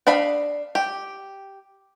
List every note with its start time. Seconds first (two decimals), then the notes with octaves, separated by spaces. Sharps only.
0.07 D4 D#5 F5 B5
0.75 G4